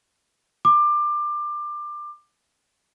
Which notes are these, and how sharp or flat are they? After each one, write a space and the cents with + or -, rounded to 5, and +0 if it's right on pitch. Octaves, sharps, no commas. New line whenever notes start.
D6 +20